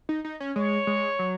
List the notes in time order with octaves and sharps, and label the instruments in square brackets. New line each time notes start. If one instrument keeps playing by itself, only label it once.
[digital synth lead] D#4
D#4
C#4
[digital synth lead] G#3 [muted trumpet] C#5
[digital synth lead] G#3
F#3